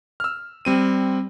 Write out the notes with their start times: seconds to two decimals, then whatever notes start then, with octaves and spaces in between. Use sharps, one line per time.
0.20 E6 F6
0.65 G3 C4 D#7